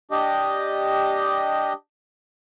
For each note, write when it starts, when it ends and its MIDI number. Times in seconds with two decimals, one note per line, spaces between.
0.11 1.73 62
0.11 1.73 67
0.11 1.73 75